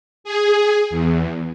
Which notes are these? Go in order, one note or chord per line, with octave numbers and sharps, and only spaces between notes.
G#4
E2